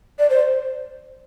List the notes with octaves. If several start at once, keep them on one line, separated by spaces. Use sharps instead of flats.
D5
C5